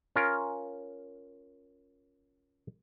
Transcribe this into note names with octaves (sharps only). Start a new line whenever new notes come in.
C#4 F4 A#4